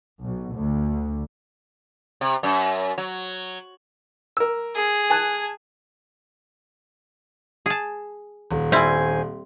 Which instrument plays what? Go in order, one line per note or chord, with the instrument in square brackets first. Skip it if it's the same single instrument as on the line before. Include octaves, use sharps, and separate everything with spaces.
[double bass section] B1
D2
[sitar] C3
F#2
F#3
[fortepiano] A#4 E6
[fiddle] G#4
[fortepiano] G#5 A5 F#6
[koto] G#4 A5
[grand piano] D#1
[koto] G3 C4 E4 [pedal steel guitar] C5 G#5